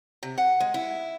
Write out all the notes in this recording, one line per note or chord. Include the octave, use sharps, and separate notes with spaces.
C3
F#5
G#3
E4